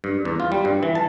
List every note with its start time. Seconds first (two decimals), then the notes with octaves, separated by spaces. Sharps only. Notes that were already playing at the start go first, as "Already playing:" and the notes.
0.04 G2
0.25 E2
0.40 F4
0.52 G3
0.65 G2
0.83 E3
0.95 A5